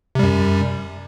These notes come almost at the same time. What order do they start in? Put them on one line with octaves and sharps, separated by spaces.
C3 G3 F#2